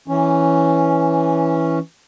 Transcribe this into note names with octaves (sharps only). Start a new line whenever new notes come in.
E3 C#4